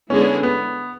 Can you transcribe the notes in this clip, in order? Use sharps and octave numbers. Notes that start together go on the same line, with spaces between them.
D3 G#3 B3 C#4 E4 G#4
B3